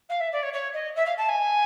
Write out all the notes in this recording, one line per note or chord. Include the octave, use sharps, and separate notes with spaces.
F5
E5
D5
C#5
C#5
D#5
E5
F5
A5
G#5